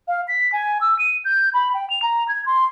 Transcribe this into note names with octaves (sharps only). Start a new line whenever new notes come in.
F5
B6
G#5
E6
D#7
G6
B5
G5
F7
A#5
G#6
C6